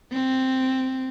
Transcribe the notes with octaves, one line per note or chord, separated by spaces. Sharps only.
C4